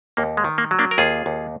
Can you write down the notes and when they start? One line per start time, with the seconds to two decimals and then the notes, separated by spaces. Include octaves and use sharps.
0.17 D#2 A#3
0.37 G#3
0.44 D#3
0.58 A#3
0.71 F#3
0.79 A#3 D4
0.91 A#4
0.98 D#2 F4 G#4
1.26 D#2